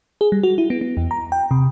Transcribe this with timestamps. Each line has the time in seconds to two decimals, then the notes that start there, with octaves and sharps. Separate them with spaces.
0.21 G#4
0.32 G3
0.43 F#4
0.58 E4
0.70 B3
0.81 B3
0.97 E2
1.11 A#5
1.32 G5
1.51 C3